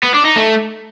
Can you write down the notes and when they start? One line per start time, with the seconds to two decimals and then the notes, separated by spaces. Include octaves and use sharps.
0.03 B3
0.14 D4
0.25 D#4
0.36 A3